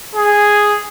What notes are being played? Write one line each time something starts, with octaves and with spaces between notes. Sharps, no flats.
G#4